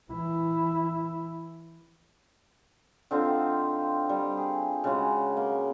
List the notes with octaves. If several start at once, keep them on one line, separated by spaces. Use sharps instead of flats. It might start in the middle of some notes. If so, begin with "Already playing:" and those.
E3 E4
D3 C4 D#4 F4
G3
G#4
C#3 G#3 F#4
A#3